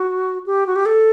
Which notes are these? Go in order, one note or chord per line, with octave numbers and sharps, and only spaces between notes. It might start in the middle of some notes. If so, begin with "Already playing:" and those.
Already playing: F#4
G4
F#4
G4
A4